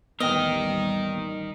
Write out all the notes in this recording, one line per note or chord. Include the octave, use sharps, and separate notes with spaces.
A1 D#2 G3 B3 D#4 A#4 D#5 G5